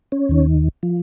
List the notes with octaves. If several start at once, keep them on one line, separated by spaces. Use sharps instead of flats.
C#4
D#2 D#3
F3